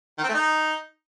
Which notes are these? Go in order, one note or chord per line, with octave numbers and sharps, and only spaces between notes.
D#3
C4
A3
D#4